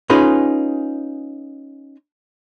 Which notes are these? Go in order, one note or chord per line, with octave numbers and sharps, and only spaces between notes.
C#4 D#4 F4 G#4 B4